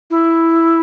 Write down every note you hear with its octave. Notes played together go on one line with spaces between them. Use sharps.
E4